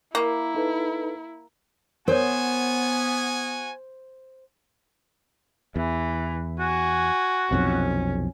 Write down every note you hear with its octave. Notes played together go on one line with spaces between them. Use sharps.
A#3 E4
D#4 A4 B4
B3 F#4 A#4 C5 C#5 G#5
E2 E3
F#4 G#5
B1 F2 C3 C#4